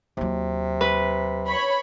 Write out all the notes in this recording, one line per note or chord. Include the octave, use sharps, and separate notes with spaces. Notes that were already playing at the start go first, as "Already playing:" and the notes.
D#2 C3 F#3
B4
C#5 B5